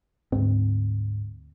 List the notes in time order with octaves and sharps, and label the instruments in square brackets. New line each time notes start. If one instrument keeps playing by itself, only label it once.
[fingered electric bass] D2 C4 [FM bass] G#2